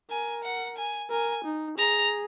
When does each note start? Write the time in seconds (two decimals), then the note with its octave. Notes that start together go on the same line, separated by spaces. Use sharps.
0.10 A#4 G#5
0.44 F#5
0.78 G#5
1.10 A#4 G#5
1.45 D#4
1.78 G#4 A#5